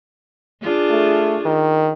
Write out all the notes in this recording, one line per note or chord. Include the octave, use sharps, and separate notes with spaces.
D4 F4 G#4
A3
D#3